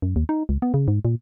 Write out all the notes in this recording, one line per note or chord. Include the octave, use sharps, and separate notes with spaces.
F#2
D#2
D#4
C#2
B3
C#3
G#2
A#2